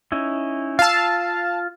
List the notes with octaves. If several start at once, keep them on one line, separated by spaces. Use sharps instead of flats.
C#4 D#4 E4
F4 F5 A5 E6